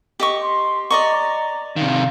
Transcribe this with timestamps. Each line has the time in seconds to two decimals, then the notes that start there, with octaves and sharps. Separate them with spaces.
0.20 G4 D#5 C#6
0.42 C6
0.90 D5 D#5 A#5 C#6
1.76 C3 D#3 F5